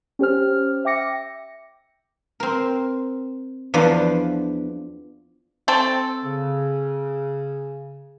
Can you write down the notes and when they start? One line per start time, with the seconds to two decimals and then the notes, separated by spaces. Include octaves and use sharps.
0.19 C#4 G4 C5 F6
0.85 E5 G5 D6 A#6 C#7
2.40 C4 A#4
3.74 E2 F3 D4 B4 D5
5.68 C4 A4
6.24 C#3